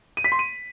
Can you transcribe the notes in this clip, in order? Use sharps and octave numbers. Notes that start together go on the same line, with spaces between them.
D#7
B6
C6
D#7